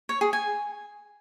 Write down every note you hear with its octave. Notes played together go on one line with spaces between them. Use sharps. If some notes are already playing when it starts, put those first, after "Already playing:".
C#5
G#4
G#5